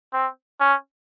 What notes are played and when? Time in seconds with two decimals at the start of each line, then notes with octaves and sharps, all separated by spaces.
0.13 C4
0.60 C#4